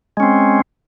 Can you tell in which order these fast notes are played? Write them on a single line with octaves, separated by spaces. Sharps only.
G#3 C#4 C4